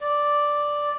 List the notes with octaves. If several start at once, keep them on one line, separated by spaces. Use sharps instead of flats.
D5